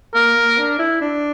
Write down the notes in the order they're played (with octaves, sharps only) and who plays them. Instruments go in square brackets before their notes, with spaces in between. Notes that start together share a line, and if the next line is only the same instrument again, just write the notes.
[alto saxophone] A#3 [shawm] A#4
[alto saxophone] A#3
D4
E4
D4